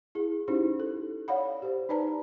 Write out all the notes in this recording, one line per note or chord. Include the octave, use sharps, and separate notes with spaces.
E4 G#4
C#4 D#4 E4 G4 C5
A4
C#5 D5 F5 F#5 B5
G4 C5
D#4 B4 D5 A5 A#5